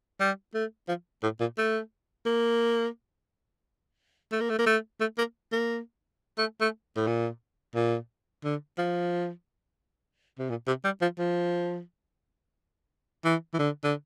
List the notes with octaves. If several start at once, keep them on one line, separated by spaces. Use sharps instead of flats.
G3
A3
F3
A2
A#2
A3
A#3
A3
A#3
A3
A#3
A3
A3
A#3
A#3
A3
A3
A2
A#2
A#2
D3
F3
C3
A#2
C3
G3
F3
F3
E3
E3
D3
D3